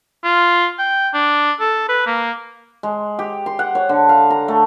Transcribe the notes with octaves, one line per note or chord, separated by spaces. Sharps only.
F4
G5
D4
A4
B4
A#3
G#3
G4
C6
F#5
C#5
D3
F5
A#5
A3